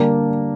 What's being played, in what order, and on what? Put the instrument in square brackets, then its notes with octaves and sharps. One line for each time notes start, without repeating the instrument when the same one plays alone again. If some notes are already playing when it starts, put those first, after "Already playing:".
Already playing: [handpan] D3 G3 D4 G4 [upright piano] A#3